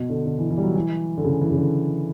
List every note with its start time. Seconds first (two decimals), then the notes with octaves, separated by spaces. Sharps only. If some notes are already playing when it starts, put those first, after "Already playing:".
Already playing: B2
0.09 D3
0.26 D3
0.38 E3
0.50 E3
0.58 G3
0.63 F#3
0.75 E3
1.17 D3
1.24 C#3
1.41 E3
1.51 C#3
1.57 D3